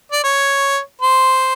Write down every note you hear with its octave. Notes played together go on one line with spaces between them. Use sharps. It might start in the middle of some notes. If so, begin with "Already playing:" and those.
D5
C#5
C5